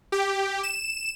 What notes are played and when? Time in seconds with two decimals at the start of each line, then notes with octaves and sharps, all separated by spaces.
0.12 G4
0.63 E7